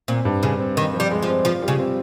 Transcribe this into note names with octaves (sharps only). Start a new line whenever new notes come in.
A#2 C4
G2
G2 C#3
C4
D#3 C4
F3
G3
G#3
F3
C4
F3 F4
G3
C#3
C4